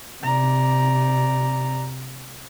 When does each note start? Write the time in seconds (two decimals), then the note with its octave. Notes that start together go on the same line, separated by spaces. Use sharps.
0.23 C3 D5 A#5